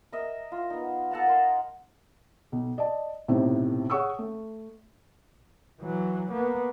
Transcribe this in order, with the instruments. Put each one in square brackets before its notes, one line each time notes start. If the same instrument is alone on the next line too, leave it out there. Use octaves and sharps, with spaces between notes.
[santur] A#4 D#5 E5
F4
B3 D#4
A4 F#5 A5 A#5
A#4 D#5 C6
[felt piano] B1
D5 D#5 A5
B1 A2 C3 D#4 E4 C5
G#4 C#5 F#5 C#6 D#6 E6
A3
[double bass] E3 F#3
A#3 B3